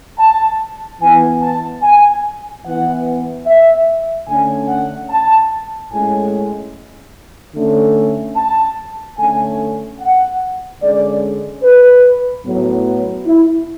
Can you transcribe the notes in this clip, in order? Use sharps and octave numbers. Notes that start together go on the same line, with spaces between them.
A5
E3 B3 G#5
A5
G#5
E3 B3 F#5
E5
D3 A3 C#4 G#5
F#5
A5
A2 G#3 C#4 G#5
D3 A3 C#4
A5
D3 A3 C#4 G#5
F#5
D3 G#3 C#4 D5
B4
A2 F#3 B3
E4